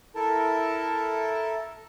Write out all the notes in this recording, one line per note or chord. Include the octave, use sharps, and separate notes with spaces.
E4 A4 A#4 A5